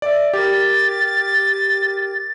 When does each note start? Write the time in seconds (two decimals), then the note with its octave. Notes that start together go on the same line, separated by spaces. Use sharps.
0.02 D5 E5
0.33 G4 A#4 A6